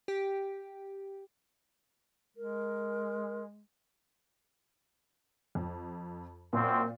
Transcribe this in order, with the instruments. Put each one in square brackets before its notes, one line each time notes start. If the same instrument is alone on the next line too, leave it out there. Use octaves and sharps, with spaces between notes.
[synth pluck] G4
[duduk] G#3 [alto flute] A#4
[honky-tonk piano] F2
[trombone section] F#2 C4 [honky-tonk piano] A#2